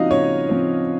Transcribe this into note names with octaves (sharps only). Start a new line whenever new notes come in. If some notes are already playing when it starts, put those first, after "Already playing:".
Already playing: C#3 F3 C4 D#4 F#4 D#5 F5
C#3 C#4 C#5
F3 C4